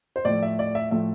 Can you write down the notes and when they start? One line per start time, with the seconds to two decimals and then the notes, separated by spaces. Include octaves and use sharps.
0.16 C5
0.25 A2 F3 A3 D5
0.43 E5
0.59 D5
0.75 E5
0.91 A2 F3 A3 E5